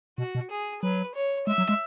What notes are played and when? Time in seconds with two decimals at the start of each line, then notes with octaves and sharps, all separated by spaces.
0.18 B2 F#4
0.35 B2
0.50 G#4
0.82 F#3 B4
1.15 C#5
1.47 G#3 E5
1.58 F#3
1.69 G#3